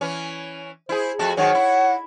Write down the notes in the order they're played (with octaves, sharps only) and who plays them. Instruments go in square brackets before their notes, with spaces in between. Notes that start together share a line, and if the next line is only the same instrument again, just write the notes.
[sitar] E3 C#4
[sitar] E4 G#4 [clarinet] C5
[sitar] F2 A3 F#4 [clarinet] A5
[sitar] G#2 D#3 F#3 [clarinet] C#5 [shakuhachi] F#5
[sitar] E4